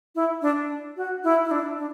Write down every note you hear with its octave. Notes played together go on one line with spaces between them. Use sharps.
E4
D4
F#4
E4
E4
D4
D4